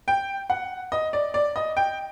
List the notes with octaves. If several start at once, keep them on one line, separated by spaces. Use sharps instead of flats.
G5
F#5
D#5
D5
D5
D#5
G5